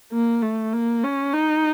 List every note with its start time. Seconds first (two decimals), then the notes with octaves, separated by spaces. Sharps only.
0.12 A#3
0.42 A3
0.73 A#3
1.04 C#4
1.33 D#4